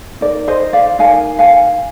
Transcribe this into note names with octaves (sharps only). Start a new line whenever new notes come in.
D#4 A#4 D5
C5 D#5
D5 F5
D#4 A#4 F5 G#5
F5 G#5